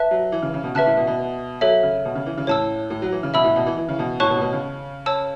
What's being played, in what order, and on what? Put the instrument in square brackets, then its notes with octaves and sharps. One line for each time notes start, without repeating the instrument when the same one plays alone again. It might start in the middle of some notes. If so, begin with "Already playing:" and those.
Already playing: [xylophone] B4 E5 A5 F#6
[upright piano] F#3
E3
C#3
C#3
B2
[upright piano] C#3 [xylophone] B4 E5 A5 F#6
[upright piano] A2
B2
B2
[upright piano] F#3 [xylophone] A4 C#5 E5
[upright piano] C#3
B2
C#3
E3
C#3
[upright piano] A2 [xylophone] C#5 A5 E6
[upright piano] A2
F#3
E3
C#3
[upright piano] B2 [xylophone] E5 B5 E6
[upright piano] A2
B2
E3
E3
C#3
B2
[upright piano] A2 [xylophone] C#5 A5 C#6 F#6
[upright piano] B2
A2
B2
C#3
[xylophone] C#5 A5 E6